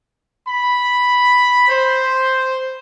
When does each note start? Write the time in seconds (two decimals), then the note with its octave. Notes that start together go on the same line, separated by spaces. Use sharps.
0.48 B5
1.69 C5